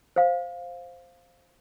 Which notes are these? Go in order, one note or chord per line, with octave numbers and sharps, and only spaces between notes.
C5 F5